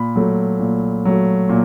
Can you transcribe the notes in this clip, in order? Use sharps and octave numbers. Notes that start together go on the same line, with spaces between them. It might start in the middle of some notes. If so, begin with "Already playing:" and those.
Already playing: A#2 B5
F#3 A3
A#2
F#3 A3
A#2